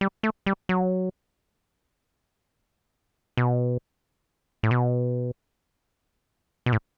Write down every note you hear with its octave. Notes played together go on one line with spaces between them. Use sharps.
G3
A3
G3
F#3
B2
A2
B2
B2
A2